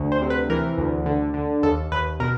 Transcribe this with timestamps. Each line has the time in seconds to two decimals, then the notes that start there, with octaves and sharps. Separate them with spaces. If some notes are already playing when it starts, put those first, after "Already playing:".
Already playing: D2
0.12 C5
0.22 C3
0.30 B4
0.49 E3 A#4
0.78 D2
1.06 D3
1.34 D3
1.63 D#2 A4
1.91 D#2 B4
2.20 B2 A#4